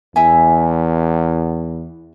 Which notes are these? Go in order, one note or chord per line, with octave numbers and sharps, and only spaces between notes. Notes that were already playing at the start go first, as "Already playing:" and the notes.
E2 E4 E5 G#5